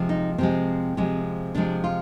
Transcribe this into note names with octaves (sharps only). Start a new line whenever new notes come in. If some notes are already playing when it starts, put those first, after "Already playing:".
Already playing: C3 F3 G#3
D#4
C3 F3 G#3 C4
C3 F3 G#3
C3 F3 G#3 D4
F4